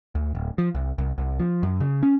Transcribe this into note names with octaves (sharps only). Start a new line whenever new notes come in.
D2
D1
F3
C2
C2
C2
F3
F#2
C#3
C#4